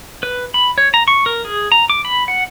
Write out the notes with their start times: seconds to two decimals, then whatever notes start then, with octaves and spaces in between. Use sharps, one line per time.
0.23 B4
0.54 B5
0.78 C#5
0.94 A#5
1.08 C#6
1.26 A#4
1.45 G#4
1.72 A#5
1.90 D6
2.05 B5
2.28 F#5